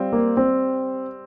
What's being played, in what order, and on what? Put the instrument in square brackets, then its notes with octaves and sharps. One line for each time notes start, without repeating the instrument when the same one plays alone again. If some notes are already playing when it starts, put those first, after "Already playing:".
Already playing: [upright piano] G3 C4 F4
[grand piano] A#3
C4